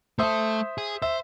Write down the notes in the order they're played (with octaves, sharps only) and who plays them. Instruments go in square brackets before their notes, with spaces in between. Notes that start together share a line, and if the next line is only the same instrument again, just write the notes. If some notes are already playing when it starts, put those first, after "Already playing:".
[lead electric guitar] A3 A4 [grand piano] C5 E5 D#6
[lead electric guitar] G#4
[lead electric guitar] C5 [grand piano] E5